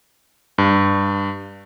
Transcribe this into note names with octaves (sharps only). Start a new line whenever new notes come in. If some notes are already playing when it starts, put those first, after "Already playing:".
G2